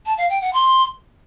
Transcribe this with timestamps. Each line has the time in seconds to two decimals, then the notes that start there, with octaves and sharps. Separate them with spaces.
0.06 A5
0.18 F5
0.30 G5
0.42 F#5
0.53 C6